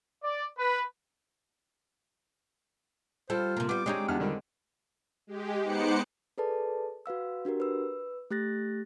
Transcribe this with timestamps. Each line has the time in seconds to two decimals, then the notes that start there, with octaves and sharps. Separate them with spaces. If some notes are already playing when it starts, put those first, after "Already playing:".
0.22 D5
0.56 B4
3.30 G3 F4 A4 C5
3.57 C3 A#3
3.69 G3 B3 D6
3.86 G#3 C4 D4 D#4 G4 C#5 D#5
4.08 E2 D4 F#5 F6
4.20 D3 D#3 G3 D4
5.27 G#3 G4
5.63 B3 D#4 C5 D6 F#6 C#7
6.38 G#4 A4 B4 D5 A5
7.06 F#4 B4 F5 E6
7.45 D4 F#4 G4 A#4
7.60 B4 E6
8.31 A3 G4 F#6 A6 A#6